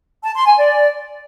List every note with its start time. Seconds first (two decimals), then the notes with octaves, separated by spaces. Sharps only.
0.24 A5
0.35 C6
0.47 G#5
0.58 D5